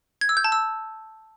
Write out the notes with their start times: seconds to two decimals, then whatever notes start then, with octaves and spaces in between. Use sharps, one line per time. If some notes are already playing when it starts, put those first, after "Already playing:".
0.21 G#6
0.29 E6
0.37 G6
0.44 A5
0.52 E6